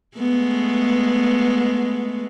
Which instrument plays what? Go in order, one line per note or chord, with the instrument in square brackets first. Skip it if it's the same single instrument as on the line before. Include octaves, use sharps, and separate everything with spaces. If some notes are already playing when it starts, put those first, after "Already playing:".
[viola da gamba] G#3 A3 B3